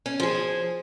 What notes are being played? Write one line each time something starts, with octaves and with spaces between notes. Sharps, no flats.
C#4
F3 G#4